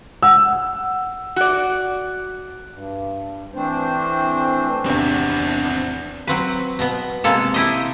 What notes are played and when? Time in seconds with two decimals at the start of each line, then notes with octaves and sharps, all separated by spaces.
0.23 F#5 E6
1.36 F#4 D5
2.71 G2
3.54 E3 A3 C4 D4 C5
4.86 E2 C3 C4 D4 F#4
6.27 F#3 C4 B4
6.79 B2 B3
7.24 C3 G#3 A#3 A4
7.54 E4 G4 D#5